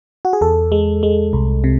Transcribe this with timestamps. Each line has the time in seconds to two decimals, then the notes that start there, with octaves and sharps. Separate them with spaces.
0.25 F#4
0.33 G#4
0.41 E2 A4
0.72 G#3
1.03 G#3
1.33 C2
1.64 C3